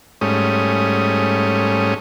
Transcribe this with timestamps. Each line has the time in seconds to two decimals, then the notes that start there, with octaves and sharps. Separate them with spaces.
0.21 G#2 G3 A3 C#4 D#6